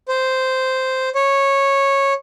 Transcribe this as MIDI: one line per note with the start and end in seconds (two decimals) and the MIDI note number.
0.09 1.09 72
1.15 2.13 73